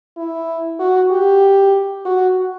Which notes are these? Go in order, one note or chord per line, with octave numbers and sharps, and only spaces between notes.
E4
F#4
G4
F#4